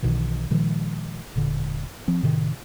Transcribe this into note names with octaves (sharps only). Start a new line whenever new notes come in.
B1 B2 D#3 E3
A#2 D#3 F3 G#3
E1 A#2 D3
F3 C4
A2 C3 D#3